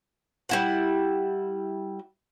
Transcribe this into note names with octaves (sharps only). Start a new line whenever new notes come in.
G3 E4 F#5